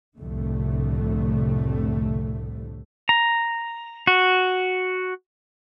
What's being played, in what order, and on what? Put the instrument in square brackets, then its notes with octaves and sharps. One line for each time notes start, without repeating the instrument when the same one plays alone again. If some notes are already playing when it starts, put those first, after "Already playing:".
[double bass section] C2 F2 A2 D3 A3
[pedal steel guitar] A#5
F#4